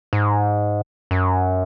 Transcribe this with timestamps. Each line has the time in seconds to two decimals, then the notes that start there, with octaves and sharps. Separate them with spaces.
0.13 G#2
1.11 F#2